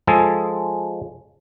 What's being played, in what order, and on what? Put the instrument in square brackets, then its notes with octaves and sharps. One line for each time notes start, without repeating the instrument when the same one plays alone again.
[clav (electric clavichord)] F3 G#3 G#4 A4